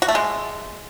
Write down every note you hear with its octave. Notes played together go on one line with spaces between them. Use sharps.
F#4
A3
G#3